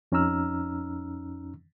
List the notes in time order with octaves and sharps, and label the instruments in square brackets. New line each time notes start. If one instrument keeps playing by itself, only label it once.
[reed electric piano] F2 C#4 D#4 A#5 E6 F6